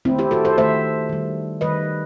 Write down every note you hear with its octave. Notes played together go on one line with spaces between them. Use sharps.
D#3 A3 C4 E4
E4 G4
F#4 A4
A4 C5
D#3 A3 C5 E5
D#3 G3
D#3 G3 B4 D#5